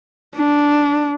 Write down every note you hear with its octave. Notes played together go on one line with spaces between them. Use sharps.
D4